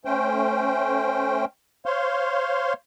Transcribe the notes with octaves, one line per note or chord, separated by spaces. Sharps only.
A3 C#4 C5 G5
C5 C#5 F5 C6